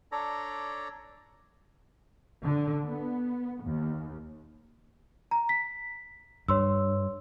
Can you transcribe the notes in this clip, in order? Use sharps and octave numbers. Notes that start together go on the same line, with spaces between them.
D4 A4 C#5 D5 A#5
D3
B3
D#2
A#5
B6
G2 C#5 C6 E6